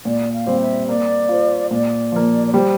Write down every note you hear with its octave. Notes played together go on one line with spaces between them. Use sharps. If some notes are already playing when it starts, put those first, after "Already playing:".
A#2 D5
F5
G3 C4 G4 C5
E5
A#3 D5
F4 C5
A#2 D5
F3 A#3
D5
G3 C5